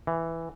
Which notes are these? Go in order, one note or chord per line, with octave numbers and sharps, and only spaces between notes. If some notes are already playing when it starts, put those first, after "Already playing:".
E3